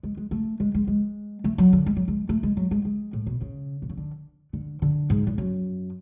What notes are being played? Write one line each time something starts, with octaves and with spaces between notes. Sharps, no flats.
G#3
G#3
A3
G#3
G#3
G#3
A3
F#3
D3
G#3
F#3
G#3
A3
G#3
F#3
G#3
G#3
A2
B2
C#3
B2
C#3
D3
D3
D3
G#2
E2
F#2